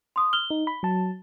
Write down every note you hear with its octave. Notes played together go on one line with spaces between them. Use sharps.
C6 D#6
F6 G7
D#4
B5
F#3 A5